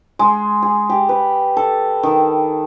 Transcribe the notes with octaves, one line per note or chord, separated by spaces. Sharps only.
G#3
G#4
G4
B4
A4
D#3